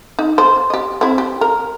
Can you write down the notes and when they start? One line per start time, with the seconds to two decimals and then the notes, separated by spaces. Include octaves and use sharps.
0.19 D#4
0.38 C5
0.70 G4 D#5
1.01 C4 E4
1.18 G4
1.41 A#4